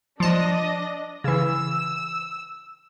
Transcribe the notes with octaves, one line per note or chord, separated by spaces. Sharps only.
F3 D4 D#5 A5 A#6
C#3 E3 E6